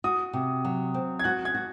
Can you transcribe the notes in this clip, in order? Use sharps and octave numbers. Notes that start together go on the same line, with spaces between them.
F#4 D#6
C3
F#3
C4
G#6
F#4 F#6
G#6
F#4